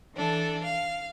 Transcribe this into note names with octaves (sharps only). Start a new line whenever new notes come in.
E3 D4 A4
F5